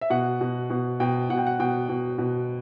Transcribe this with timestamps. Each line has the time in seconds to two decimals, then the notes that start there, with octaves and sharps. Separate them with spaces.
0.01 E5
0.10 B2 F#5
0.41 B2
0.70 B2
1.00 B2 G5
1.30 B2 F#5
1.38 G5
1.47 F#5
1.59 B2 G5
1.89 B2
2.18 B2